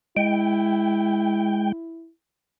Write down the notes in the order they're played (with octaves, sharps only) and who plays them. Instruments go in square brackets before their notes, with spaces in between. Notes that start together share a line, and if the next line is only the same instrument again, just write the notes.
[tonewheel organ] G#3 G5 [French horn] E4